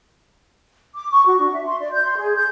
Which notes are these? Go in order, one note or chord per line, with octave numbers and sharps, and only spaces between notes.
D6
C#6
F#4
D4
E5
C6
D5
G6
C6
G#4
G6